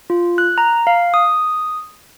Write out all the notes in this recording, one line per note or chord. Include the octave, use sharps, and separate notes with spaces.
F4
F#6
A#5
F5
D#6